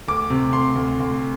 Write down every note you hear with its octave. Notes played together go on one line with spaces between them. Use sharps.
D2 D6
C3
D2 C6
D2
D2